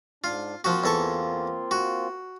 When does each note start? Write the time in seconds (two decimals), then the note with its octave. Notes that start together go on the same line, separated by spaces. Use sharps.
0.24 G#2 D4 F4
0.64 F3 A#3 C4 F4 F#4
0.84 E2 A4 C#6
1.71 F#4